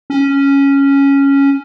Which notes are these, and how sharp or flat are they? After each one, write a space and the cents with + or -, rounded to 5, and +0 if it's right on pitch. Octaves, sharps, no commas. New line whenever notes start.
C#4 +0